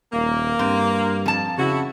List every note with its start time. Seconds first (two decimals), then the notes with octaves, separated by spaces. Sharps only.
0.13 D#1 A#3
0.59 G2 C4
1.26 F2 A5
1.58 C#3 E4 F#4